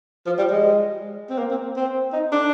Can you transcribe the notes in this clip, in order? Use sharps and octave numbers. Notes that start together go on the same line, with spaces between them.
F3
G3
G#3
C4
A#3
C4
C4
D#4
D4